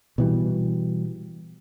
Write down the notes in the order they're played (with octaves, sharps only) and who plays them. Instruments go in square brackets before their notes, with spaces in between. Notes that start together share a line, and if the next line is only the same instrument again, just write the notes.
[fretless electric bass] B2 E3 G3